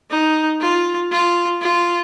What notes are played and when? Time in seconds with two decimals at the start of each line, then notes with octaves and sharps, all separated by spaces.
0.10 D#4
0.61 F4
1.11 F4
1.61 F4